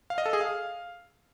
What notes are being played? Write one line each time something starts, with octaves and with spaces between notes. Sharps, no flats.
F5
D#5
A4
G#4
F5